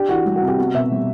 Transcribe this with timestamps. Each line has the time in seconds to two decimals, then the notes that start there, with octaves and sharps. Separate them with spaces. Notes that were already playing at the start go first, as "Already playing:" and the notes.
Already playing: D4 G4
0.09 E3 F#4
0.26 G3
0.36 F#4
0.42 C3
0.48 G4
0.58 B3 F#4
0.74 B2 E5
0.91 G3